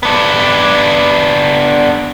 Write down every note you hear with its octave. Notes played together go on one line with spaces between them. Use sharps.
B3 D4